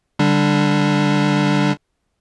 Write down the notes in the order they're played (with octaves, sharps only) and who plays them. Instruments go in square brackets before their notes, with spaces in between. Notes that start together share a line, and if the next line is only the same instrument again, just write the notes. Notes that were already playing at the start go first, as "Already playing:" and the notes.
[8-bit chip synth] D3 G3 D4